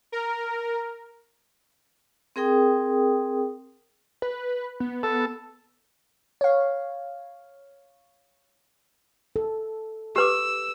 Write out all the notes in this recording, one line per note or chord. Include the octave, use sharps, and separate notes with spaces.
A#4
C4 G#4 A#4 G5 D#6
B4
B3
A4
C#5 F5
A4
G4 B4 D6 E6